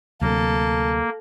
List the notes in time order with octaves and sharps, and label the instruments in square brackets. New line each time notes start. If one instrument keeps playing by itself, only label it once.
[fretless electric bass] D2 C3 F#3 [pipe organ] A#3 [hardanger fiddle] A4